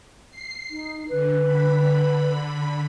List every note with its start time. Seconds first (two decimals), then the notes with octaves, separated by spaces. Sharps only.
0.30 C7
0.71 D#4
1.10 D3 B4
1.42 D3 B5